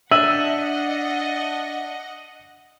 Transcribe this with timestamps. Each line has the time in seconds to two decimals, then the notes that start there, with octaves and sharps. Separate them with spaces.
0.12 D4 D#5 E5 F#5 E6 D#7 F#7